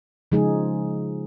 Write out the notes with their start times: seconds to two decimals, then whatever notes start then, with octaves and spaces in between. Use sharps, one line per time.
0.32 C#3 F3 G#3 D#4 G#4